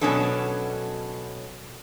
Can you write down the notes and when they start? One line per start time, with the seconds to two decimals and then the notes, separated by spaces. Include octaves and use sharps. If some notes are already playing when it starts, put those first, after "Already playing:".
0.01 B2 F#3 B3 C#4 D4 A4